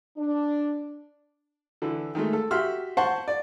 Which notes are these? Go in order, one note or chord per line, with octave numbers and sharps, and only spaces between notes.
D4
D3 E3
D#3 G#3 A3
A4
F#4 G4 E5 C6 F6
C5 F#5 A5 C6 C#6
D5